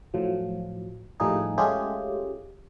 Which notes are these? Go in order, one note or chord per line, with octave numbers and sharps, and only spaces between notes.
A2 F3 F#3
A2 F3 G3 A#3 D#4 G#4
G#3 A3 C#4 F4 G4 G#4